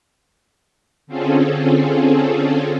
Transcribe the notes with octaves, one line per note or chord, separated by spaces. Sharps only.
D3 C4 C#4 F4 G#4 A4